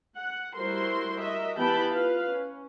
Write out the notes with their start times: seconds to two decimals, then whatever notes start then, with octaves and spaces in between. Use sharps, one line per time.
0.16 F#5
0.55 G3 E4 F#4 A#4 C5 C6
1.20 F#4 A#4 D#5 E5
1.58 E3 B3 G4 G5 A5 B5
1.92 F4 B4 F5
2.32 C#4